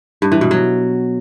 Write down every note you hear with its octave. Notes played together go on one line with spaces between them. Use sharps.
G2
E3
B2
F#3